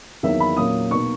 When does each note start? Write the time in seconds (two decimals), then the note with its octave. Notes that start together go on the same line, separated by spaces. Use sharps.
0.23 E2 D#3 F#3 A#3 D#4 E5
0.40 B5
0.57 A#2 F#3 A#3 C#4 D#6
0.91 B2 A#3 D#4 C#6